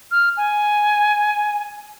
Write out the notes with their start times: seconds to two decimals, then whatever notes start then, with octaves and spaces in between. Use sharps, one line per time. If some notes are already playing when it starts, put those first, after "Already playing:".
0.11 F6
0.37 G#5